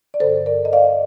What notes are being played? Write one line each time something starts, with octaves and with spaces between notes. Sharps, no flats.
D5
G2 D3 A4 C5
A#4 D5
D#5
D5 F5